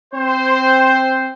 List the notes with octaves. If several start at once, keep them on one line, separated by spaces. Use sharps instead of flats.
C4 C5